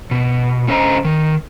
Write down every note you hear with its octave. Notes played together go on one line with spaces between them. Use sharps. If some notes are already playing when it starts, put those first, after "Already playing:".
B2
D3 C#4 D4 C5 D#5 A#5
D#3